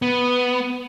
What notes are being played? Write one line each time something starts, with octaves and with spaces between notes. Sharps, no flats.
B3